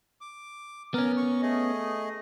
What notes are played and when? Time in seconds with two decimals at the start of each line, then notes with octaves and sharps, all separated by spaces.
0.21 D6
0.94 B3 C#4 A#4
1.17 C#6
1.42 A3 G#4 D#5